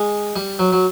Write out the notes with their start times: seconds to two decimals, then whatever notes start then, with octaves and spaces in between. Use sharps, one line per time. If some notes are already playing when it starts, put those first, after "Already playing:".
Already playing: G#3
0.36 G3
0.59 F#3
0.72 F#3